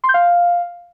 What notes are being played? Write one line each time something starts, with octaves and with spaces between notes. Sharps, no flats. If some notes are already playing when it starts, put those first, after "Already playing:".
C6
G6
F5